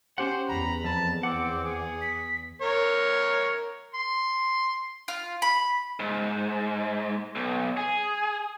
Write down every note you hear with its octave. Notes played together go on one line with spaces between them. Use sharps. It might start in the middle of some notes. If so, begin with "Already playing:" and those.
C#4 G4 C5 F#5
E2 A#5 B5
F2 A5
C4 F#5 D6
G#4
B6
A#4 C#5
C6
F4
B5
G#2
B1
G#4